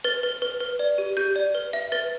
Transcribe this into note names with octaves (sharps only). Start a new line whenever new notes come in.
B4 A6
B4
B4
B4
D5
G4
G4 G6
D5
B4
E5
B4 A6